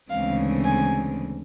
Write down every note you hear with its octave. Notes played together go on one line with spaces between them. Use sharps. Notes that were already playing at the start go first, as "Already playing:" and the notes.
D2 C#3 E3 G#3 C4 F5
G#5